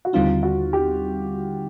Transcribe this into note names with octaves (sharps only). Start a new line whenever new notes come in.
F#4
D#2 D3 G3 C4 D#4 F4
F#4
G4